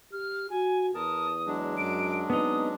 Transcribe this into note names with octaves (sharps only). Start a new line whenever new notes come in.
G4 F6
F#4 G#5
E2 A#4 A5 D#6
F#3 G#3 D4
F#2 D7
B3 C4 D#4 D#6